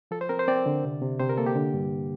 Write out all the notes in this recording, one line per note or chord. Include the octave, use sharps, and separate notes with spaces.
F3 A4
C5
C4 A#4
C5
C4 D5
D3
C3
C3
C3 C5
A#4
A#3 A4
G4
D3
G2